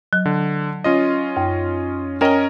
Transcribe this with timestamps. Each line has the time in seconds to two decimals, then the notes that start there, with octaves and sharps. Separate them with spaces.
0.13 F#3
0.25 D3
0.84 C#4 F4 D#5
1.37 F#2
2.21 C#4 A#4 D#5 G5 A#5